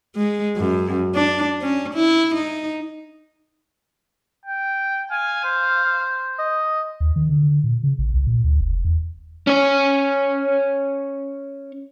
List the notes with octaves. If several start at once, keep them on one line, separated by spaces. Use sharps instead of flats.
G#3
F#2
D4
C#4
E4
D#4
G5
F5 G#5
C5
D#5
D#2
D#3
D3
D3
A#2
C#3
A1
C2
A#2
D2
F1
E2
C#4 C#5